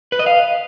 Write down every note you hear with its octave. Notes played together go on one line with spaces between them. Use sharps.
B4
D#5
F5